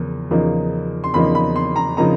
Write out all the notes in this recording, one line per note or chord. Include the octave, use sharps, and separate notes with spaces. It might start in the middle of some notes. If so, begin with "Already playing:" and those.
Already playing: E2 C#3 F3 A#3
E2 C#3 F3 A#3 D#4
C6
E2 C#3 F3 A#3 D#4 B5
B5
C6
A#5
C#3 F3 A#3 D#4 A#5